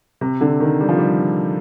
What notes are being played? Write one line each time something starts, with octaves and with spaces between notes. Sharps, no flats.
C3
D3
D#3
G3
F3
G3